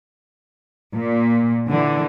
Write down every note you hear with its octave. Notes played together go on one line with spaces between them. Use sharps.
A#2
D3 E3